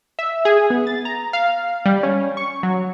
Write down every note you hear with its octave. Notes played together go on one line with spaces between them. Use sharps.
E5
G#4
B3
A6
A#5
F5
G3
C#4
C#6
F#3